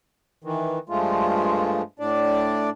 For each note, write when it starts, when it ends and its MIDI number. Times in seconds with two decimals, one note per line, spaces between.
0.44 0.79 51
0.44 0.79 52
0.89 1.82 43
0.89 1.82 53
0.89 1.82 56
0.89 1.82 57
0.89 1.82 65
1.99 2.70 45
1.99 2.70 62
1.99 2.70 74